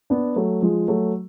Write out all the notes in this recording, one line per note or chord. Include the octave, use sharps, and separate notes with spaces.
B3 D4
F#3 A3
F3 G#3
F#3 A3